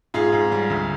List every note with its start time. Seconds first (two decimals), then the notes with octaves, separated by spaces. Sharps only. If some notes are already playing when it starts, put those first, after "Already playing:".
0.14 G#2 F4 G#4
0.33 G#2
0.52 G3
0.70 D2